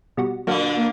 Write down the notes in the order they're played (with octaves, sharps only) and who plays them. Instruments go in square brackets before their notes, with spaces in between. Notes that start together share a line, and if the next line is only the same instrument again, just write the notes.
[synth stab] B2 G3 F#4
[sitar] A#2 D3 [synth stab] F#3 A#3 F#4
[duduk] A#3